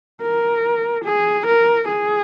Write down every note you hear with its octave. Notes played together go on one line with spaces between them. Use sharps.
A#4
G#4
A#4
G#4